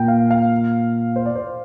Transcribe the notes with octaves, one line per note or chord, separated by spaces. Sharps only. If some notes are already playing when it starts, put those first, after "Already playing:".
Already playing: A#2 A#3 G5
F5
F5
C5
D5
C5